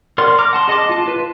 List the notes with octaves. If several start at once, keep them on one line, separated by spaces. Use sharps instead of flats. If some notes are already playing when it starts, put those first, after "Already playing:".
A#4 D5 F#5 C6
A#5 D6 F6
F#5 A5 C6
G#4 D#5 F#5 A5 D6
F4 A5
F4 B4